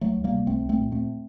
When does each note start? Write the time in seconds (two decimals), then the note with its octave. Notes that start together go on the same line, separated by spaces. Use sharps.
0.01 D2 F#3 A3
0.17 D2
0.24 G3 A#3
0.31 C3
0.47 C2 A3 C4
0.62 C2
0.69 A3 C4
0.77 A#2
0.91 D#2 A3 C4